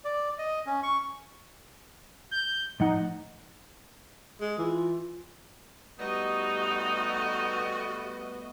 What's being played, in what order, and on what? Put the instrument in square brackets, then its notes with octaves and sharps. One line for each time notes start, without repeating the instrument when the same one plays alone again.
[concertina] D5
D#5
C#4
C#6
[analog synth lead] G6
[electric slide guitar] A2 F3 F#5 [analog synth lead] D#4
[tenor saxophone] G#3
[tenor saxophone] E3 [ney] F4
[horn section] G3 A3 B3 [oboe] D#4 [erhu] F#4 [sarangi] D#5